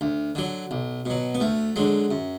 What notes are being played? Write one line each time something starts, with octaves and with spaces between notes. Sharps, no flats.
D2
D3 F#3
B1
B2 F#3
B3
D2 A3
D3 F#3 G#3
F#2